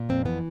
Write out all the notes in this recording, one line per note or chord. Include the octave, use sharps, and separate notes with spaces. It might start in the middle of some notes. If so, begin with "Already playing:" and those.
Already playing: A#2
F2 C4
E3 B3